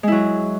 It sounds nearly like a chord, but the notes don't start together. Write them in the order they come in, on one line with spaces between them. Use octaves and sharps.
G#3 E4 F#3